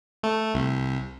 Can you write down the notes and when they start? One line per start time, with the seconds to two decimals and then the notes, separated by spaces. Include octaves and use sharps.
0.23 A3
0.54 C2